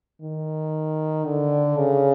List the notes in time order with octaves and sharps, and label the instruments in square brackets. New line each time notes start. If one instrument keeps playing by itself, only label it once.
[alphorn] D#3
D3
C#3